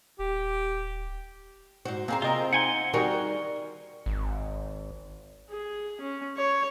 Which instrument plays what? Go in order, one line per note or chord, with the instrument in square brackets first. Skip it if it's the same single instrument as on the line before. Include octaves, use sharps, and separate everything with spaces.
[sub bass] D#1 [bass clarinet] G4
[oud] G#2 F#4 [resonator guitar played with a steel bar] C5
[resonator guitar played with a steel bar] A#3 A#5 [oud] C4 G#4 C5
[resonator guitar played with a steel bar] C3 D#5 A#5 [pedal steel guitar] F4 A#4
[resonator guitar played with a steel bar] D#4 [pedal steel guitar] F#5 G#5 C6
[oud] D#3 G#4 A#4 [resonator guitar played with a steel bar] G3 D#4 F#4
[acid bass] G#1
[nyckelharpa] G#4
C#4
C#5